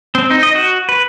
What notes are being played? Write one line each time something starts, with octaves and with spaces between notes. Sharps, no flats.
C4
D#4
D#5
F#4
B4